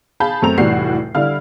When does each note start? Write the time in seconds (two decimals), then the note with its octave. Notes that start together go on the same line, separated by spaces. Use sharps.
0.20 G#4 F5 A5 B5 G6
0.42 F#2 A3 C4 A#5 F7
0.58 F1 A2 E3 G3 F#4 C7
1.15 D3 G3 E4 F5 F6